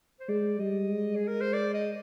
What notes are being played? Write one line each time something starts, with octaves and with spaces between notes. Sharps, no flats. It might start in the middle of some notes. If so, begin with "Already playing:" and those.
C5
G#3 D5
G3 D#5
G#3
G#4
A#4
C5
D5
D#5